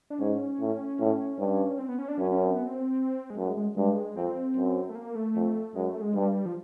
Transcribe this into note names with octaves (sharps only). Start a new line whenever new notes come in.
D4
G#2 C#4
A2
A2
G2
C4
B3
C#4
D4
F#2 C#4
C#4
C4
B3
C4
G#3
F#2 A3
G#3
G#3
G2 G#3
F2 C4
F#2
A3
A#3
A3
F2
F#2 G#3
A3
G#3
G2 G3
F3